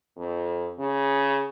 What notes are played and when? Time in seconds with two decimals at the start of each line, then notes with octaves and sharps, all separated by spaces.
0.17 F2
0.79 C#3